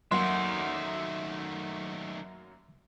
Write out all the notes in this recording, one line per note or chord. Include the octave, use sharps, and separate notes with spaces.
F#2 D#3 F#3 A3 A#3 E5 F#5 C6